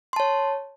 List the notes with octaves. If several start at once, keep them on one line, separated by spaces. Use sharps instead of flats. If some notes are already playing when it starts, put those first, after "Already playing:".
C#5 A5 C6